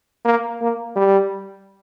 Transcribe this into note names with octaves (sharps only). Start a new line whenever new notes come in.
A#3
A#3
G3